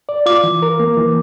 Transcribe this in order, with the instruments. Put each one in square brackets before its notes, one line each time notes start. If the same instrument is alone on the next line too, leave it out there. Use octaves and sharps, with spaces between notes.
[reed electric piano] D5
[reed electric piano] F4 [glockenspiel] D6
[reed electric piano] E3
A#4
A#3
E3